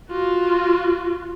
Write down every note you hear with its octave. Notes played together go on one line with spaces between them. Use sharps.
F4 F#4